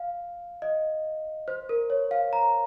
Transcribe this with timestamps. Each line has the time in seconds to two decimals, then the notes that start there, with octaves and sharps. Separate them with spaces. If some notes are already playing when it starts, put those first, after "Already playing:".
Already playing: F5
0.62 D#5
1.48 C5
1.69 A#4
1.90 C#5
2.11 F5
2.33 A#5